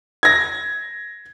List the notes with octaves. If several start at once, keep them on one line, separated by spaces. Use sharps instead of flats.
G#6 A#6